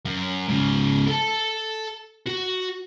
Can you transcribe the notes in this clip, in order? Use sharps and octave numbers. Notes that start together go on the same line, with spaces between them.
F#2
G#2 C#3
A4 A5
F#4